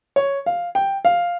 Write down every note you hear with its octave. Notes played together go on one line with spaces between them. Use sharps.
C#5
F5
G5
F5